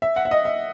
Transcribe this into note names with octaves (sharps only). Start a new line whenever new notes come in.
E5
F#5
E5
D#5
E5